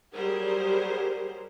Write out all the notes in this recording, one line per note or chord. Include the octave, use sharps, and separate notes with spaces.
F#3 G3 G4 G#4 A#4 C5